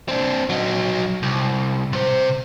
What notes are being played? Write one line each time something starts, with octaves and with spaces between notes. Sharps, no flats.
C4 D4
F#3 D#4
C2
C3 C5